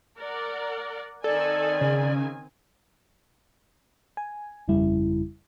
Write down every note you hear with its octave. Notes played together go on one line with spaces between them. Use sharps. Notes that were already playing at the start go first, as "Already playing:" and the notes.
A#4 D5 F#5
D#3 C4 A4 D5 G#5
C#3
G#5
G1 F2 C#3 G3 E4